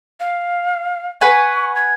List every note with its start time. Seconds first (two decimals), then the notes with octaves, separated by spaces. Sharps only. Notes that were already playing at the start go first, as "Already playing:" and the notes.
0.20 F5
1.21 B4 F#5 G#5 C#6
1.75 G#6